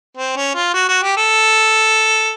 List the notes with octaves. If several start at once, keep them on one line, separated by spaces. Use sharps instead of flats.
C4
C#4
F4
F#4
F#4
G4
A4